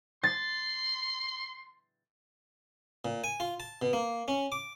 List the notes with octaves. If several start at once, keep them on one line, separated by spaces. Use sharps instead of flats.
C6 A6
A#2
G#5
F4
A5
B2
A#3
C#4
D6